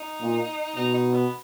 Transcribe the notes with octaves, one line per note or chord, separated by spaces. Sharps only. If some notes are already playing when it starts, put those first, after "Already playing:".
Already playing: D#4
A#2
B2 D#4
D#4
B3